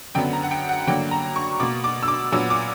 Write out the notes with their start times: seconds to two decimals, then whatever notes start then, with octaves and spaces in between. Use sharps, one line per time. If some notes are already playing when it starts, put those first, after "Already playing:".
0.15 F#2 D3 F#3 B3 G5
0.33 A#5
0.43 F#5
0.51 G5
0.69 F#5
0.87 G2 D3 F#3 A#3 G5
1.11 A#5
1.36 C#6
1.60 B2 A#3 D6
1.84 D6
2.03 E6
2.08 D6
2.32 A#2 F#3 B3 E6
2.50 D6